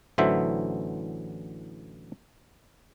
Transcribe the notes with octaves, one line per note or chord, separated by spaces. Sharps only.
A1 D3 E3 F#3 C5 E5